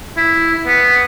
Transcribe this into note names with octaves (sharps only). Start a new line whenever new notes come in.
E4
B3